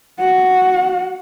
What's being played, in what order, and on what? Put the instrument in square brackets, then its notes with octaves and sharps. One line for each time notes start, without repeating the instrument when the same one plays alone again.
[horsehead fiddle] F#4 F#5